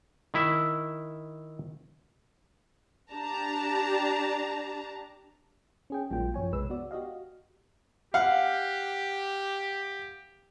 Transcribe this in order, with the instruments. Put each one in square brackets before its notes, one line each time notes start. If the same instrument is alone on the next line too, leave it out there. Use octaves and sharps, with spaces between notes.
[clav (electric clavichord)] D#3 E4 E5
[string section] D4 G4 A5 A#5
[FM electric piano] C#4 G#4 G5
A#1 F#3 G#3 A#3 F4 G5
F#2 F3 C#5 G#5
B1 C3 G#3 B4 E6
B3 F#4 D5
F#4 G4 D#5 F5
[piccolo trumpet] G4 [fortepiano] F5 F#5